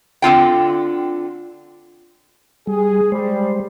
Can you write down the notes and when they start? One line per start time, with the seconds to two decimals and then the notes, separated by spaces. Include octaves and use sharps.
0.22 D3 C4 F4 G5
2.67 G3 G#4
3.12 G3 G#3 C5